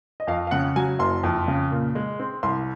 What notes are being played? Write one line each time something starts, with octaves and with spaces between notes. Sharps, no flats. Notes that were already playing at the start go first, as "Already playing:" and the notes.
D#5
F2 F5
F5
C#3 F#5
F#3 G#5
F#1 C6
F2
C#3
A#2
G#3
C4
C2 C6